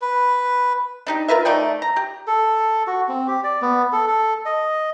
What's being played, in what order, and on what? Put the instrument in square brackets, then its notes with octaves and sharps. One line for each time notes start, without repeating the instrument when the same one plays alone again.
[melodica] B4
[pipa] D4 D#4 G4
F4 A#4 B4 E5
A3 D#4 D5 G5
A#5
G4
[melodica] A4
F#4
C4
G4
D5
B3
A4
A4
D#5